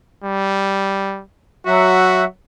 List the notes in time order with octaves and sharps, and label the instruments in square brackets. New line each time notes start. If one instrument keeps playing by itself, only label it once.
[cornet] G3
[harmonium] F#3 E5 F#5 [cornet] F#4